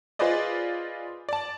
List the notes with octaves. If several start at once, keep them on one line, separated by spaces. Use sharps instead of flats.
F4 G#4 B4 C5 D5 D#5
D5 A5